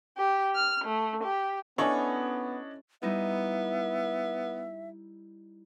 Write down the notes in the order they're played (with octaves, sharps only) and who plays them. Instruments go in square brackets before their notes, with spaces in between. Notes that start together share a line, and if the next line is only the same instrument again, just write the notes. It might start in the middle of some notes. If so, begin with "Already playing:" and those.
[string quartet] G4
F6
A3
G4
[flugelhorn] B3 [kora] C#4 E4 A4 [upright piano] D4 C#5 D#5
[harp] G3 D#4 E4 [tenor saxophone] B3 [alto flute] E5